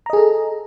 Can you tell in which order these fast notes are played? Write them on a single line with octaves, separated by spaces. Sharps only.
A#5 D#5 G#4 A4